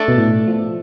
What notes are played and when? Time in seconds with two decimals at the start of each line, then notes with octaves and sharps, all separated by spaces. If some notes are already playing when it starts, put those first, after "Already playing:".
Already playing: A3 D4 A4 D5
0.08 B2
0.18 A2
0.47 F3